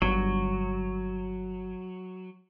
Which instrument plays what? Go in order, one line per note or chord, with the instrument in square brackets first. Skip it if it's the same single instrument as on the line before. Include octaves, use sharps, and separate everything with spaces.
[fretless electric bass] G1 G2 [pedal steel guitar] F#3